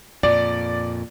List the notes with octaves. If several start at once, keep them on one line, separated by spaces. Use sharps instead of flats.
F2 A#2 D5